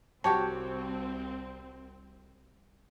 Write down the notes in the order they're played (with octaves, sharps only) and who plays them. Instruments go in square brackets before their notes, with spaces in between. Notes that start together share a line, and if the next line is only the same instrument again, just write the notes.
[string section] C2 C4 [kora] F#4 G4 C#5 [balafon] A5